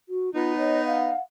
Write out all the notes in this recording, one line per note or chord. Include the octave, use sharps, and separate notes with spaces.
F#4
B3 D#4 F4
C#5 D#5
F5 F#5